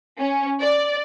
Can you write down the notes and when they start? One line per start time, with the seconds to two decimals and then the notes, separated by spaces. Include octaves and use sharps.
0.19 C#4
0.61 D5